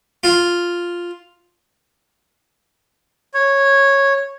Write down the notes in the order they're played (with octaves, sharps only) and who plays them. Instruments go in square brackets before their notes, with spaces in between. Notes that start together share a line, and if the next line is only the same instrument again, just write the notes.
[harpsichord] F4
[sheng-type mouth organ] C#5